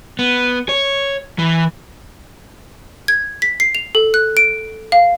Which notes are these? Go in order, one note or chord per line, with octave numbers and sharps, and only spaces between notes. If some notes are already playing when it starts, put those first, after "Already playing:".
B3
C#5
E3
G#6
B6
C7
F7
A4
F#6
D7
F5